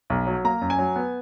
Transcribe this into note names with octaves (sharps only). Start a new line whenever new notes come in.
B1
F#3
A#3 A#5
F#2
G#5
F#3
B3